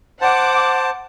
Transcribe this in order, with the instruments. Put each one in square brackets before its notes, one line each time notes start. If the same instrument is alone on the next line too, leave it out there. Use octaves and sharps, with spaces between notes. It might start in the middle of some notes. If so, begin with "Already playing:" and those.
[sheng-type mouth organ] C5 A5 [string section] F#5 D6